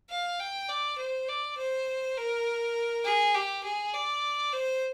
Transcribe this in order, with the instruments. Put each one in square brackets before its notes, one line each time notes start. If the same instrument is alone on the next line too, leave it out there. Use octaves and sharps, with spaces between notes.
[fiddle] F5
G5
D5
C5
D5
C5
A#4
G#4
G4
G#4
D5
C5